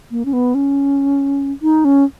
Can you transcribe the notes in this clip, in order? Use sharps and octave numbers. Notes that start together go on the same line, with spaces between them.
A#3
C#4
B3
C#4
D#4
C#4